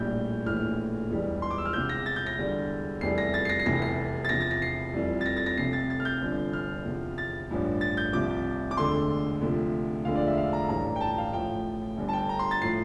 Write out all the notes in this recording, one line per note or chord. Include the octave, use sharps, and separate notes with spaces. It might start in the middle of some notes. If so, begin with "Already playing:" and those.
Already playing: A#1 A2 G3 G6
A#1 A2 E3 F6
E1 E2 E3 G3
C6
D6
E6
F6
E1 E2 C3 G6
A#6
A6
G6
A#6
E2 D3 G3
F1 E2 E3 G3 C7
A#6
A6
C7
A#6
C7
F1 E2 C3 E3 A#6
C7
A6
E2 C3 F3 A#6
A6
A#6
C7
F1 F2 E3 G3
A6
A#6
A6
A#6
F1 F2 C3 F3 C7
A6
A6
F6
G6
G1 G2 D3 F3
F6
E2 C3 F3
A6
A1 G2 F3
A6
G6
C2 C3 F3 D6
D6
E1 D2 D3 C6
D2 C3 F3
E1 D2 D3 F3 F5
D5
E5
F5
A#5
A1 G2 E3 G3 A#5
G5
A5
F5
A1 A2 F3 G5
G1 G2 D3 G3
A5
G5
A#5
C6
A6
A2 F3 C7